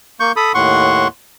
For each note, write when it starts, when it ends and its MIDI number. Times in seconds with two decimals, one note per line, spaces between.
0.20 0.32 58
0.20 0.32 85
0.20 0.32 91
0.36 0.52 69
0.36 0.52 83
0.36 0.52 87
0.54 1.07 39
0.54 1.07 45
0.54 1.07 78
0.54 1.07 84
0.54 1.07 85